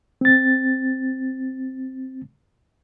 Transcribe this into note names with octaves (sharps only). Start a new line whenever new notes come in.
C4 A6